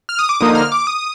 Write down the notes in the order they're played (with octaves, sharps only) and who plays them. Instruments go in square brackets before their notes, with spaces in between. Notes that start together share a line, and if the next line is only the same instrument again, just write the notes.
[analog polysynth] F6
D#6
D6
D3 F3 A#3 D#4 D#6
F6
D6
D#6